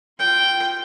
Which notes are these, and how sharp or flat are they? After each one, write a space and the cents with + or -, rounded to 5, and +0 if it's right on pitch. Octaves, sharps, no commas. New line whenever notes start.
F4 +0 G5 -5